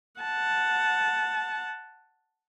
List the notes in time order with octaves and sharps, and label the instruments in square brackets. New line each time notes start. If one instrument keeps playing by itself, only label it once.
[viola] F#5 A5